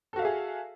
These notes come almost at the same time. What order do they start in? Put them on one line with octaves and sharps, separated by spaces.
A4 F#4 F5 E5 G#4